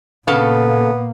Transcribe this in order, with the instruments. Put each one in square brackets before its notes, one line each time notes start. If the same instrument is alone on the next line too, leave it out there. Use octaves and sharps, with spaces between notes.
[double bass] A#2 A#3 [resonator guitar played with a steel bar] C#3 A4 F5 [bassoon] B3